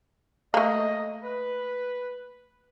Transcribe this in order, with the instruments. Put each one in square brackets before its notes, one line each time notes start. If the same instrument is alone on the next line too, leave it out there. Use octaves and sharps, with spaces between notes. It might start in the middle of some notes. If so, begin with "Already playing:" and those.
[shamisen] A3 A#3 [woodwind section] D#5
[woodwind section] B4